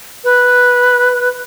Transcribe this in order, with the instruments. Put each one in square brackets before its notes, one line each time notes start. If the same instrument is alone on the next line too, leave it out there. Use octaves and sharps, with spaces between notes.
[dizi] B4